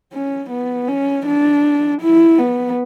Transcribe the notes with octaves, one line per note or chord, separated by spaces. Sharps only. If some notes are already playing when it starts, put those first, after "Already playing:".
C#4
B3
C#4
D4
E4
B3